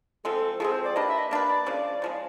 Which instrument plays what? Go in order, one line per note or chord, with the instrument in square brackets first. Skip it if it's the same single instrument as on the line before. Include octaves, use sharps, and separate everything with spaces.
[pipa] F3 G#3 C4 [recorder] A4
[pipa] F3 G#3 C4 [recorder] G#4
[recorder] C5
D5
[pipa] A#3 D4 G4 B4 [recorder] D#5
[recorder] E5
D#5
[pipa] A#3 D4 G4 B4 [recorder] D5
[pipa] C#3 F3 G#3
C#3 F3 G#3